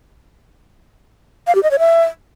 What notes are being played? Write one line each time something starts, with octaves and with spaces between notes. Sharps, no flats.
F5
G4
D#5
C#5
E5